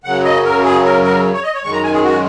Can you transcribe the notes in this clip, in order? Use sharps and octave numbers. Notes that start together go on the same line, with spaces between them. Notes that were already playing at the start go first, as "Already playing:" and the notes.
F#2 C#3 F#3 F#5
D#5
A#4
G#4
A#4
A#4
C#5
D#5
C#5
F#2 D#3 G#3 C#6
A#5
G#5
G#4
F#4